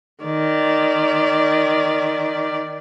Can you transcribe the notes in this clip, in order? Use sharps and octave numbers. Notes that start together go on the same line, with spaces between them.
D#3 D5